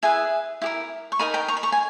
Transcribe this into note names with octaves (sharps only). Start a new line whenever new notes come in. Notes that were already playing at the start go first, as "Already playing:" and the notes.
E4 G#4 B4 E5 G#5
E4 G4 A#4
C#6
D#4 A#4 D#5 G#5 B5
G5 A#5
A#5 C#6
B5
A#5 C#6
G#5